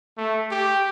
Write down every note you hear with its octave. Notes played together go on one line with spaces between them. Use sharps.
A3
G4